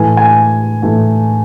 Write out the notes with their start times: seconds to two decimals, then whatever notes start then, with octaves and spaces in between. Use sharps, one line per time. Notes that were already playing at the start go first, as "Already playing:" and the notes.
Already playing: A2 E3 A3 G#5
0.17 G#5
0.82 A2 E3 A3